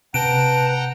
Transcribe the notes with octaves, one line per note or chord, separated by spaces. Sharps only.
C3 B4 F#5 G5 A5 A#5 D7